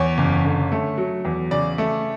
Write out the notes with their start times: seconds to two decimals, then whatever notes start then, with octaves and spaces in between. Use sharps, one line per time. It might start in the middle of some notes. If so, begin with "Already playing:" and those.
Already playing: E2 C#5
0.18 F#1
0.45 D3
0.72 A3
0.98 F#3
1.25 E2
1.51 C#3 D5
1.78 A3